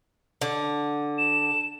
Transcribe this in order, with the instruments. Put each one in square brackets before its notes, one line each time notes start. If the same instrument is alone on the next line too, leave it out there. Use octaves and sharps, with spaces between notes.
[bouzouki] D3
[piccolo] E7